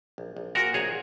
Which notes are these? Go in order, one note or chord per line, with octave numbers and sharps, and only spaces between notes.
A#1
A#1
A#2 F#4 A#4
A#1 G#4 C#5